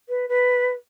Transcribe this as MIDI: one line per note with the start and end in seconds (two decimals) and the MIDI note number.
0.08 0.28 71
0.28 0.68 71